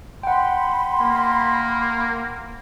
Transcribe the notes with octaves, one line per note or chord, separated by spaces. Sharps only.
F#5 G5 B5 C6
A#3